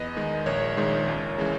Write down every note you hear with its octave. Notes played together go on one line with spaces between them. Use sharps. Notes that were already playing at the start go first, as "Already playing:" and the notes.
Already playing: E2 B4 D#5
D#3 G#3
A#1 A#4 C#5
G#2 D#3 G#3
C#2
C#3 E3 G#3